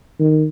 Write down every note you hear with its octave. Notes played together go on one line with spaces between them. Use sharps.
D#3